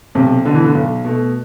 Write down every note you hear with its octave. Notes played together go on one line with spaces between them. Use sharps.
B1 C3
B2 D3 A3
E3
D3
B1
B2 A3